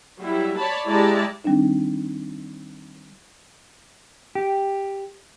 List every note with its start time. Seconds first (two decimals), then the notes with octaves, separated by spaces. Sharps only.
0.19 F#3 G3 E4
0.58 C#5 D5 A5 B5
0.86 G#3 E4 G4 D5 A5 A#5
1.44 D#3 G3 C4 D4 D#4
4.35 G4